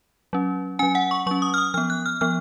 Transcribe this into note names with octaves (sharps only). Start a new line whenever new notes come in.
F#3 C#4
F#3 C#4 G#5
F#5
C#6
F#3 C#4 C#6
D#6
F6
D#6
F3 B3 F6
F#6
F6
F3 B3 F6